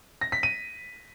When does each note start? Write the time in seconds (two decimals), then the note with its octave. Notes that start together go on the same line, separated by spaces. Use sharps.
0.21 A#6
0.32 B6
0.43 D#7